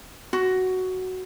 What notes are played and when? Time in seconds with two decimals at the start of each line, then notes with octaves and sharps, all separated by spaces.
0.33 F#4